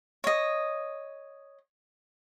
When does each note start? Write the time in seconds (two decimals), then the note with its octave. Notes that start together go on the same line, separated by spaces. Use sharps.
0.24 C#5 D#5